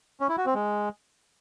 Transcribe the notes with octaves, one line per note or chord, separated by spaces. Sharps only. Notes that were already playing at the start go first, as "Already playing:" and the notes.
C#4
E4
F#4
C4
G#3